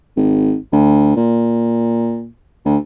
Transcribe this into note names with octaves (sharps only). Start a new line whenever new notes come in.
G#1
D2
A#2
D2